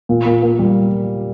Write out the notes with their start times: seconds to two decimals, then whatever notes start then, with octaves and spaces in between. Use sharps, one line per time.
0.09 A#2
0.26 A#2
0.42 A#3
0.59 G3